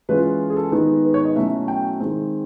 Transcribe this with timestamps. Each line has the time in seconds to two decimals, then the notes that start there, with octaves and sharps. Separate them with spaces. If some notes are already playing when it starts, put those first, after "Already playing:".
0.09 E3 G#3 C#4 F4 B4
0.50 G#4
0.56 A4
0.72 D#3 G#3 B3 D#4
1.05 B4
1.14 C#5
1.25 D#5
1.35 B2 F#3 A3 C#4 E4 E5
1.68 G5
2.00 D#3 G#3 C4